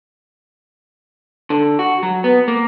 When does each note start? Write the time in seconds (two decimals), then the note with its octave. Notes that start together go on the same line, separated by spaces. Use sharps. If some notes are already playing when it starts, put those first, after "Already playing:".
1.50 D3
1.79 F#4
2.03 F#3
2.24 B3
2.48 A#3